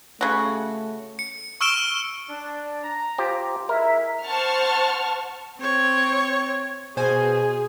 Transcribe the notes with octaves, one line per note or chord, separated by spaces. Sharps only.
C#3 A3 F#4
C#7
C#6 E6 F6 D7 E7 G7
D4
A#5
F4 G4 C5
G#3 E4 A#4 E5
C5 F#5 A5 C#6 F6
C4 C#5
B2 G#4 C5 G#5